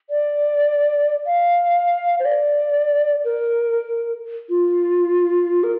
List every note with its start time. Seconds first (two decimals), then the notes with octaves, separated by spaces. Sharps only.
0.10 D5
1.26 F5
2.20 C5
2.25 D5
3.25 A#4
4.50 F4
5.64 A#4